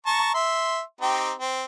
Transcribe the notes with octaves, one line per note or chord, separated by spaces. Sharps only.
A5 A#5 C#6
E5 C6
C4 D#4 G4
C4